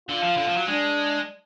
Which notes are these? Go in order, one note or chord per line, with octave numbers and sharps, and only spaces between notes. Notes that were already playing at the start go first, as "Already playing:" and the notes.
D3 F4
F3
D3
F3
F#3
G#3 D4